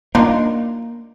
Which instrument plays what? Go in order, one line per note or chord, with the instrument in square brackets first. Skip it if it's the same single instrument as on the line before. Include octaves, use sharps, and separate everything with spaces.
[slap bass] A#3 [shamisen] D4 D#4 F4